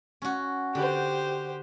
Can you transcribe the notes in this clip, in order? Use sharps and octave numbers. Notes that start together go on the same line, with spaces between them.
C#4 F#4
D3 G4 C5